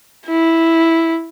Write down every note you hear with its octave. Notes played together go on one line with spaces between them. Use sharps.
E4